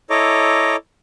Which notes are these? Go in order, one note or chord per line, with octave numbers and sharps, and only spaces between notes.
E4 A4 C#5 D#5 A#5 D6